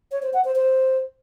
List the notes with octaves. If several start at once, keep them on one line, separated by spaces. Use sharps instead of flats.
C#5
C5
F#5
C5
C5